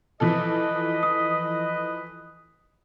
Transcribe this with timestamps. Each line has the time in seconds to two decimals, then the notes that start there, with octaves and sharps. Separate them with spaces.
0.20 E3 F3 A4 B4 D#5
1.03 D#6